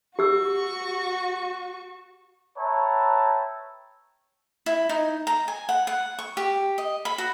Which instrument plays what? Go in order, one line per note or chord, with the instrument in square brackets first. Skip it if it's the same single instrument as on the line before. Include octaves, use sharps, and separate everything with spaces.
[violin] F#4 C#6 [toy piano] G4 E6
[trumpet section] B4 C#5 E5 G5 A5 A#5
[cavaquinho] E4
D#4
A#5
G#5
F#5
F#5
C#6
G4
D#5
B5
F#4